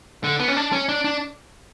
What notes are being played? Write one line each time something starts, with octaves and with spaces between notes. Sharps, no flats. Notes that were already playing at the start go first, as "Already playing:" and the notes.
D3
B3
C#4
D4
C#4
D4
D4